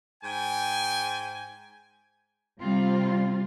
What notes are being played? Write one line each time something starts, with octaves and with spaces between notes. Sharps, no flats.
G#2 G5 G#5
C3 G3 C4 F4